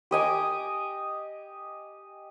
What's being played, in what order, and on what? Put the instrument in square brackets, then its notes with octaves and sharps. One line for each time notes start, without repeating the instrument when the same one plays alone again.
[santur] G4 D#5 G#5 D6